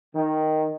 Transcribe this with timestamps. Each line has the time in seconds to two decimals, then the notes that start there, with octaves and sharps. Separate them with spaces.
0.14 D#3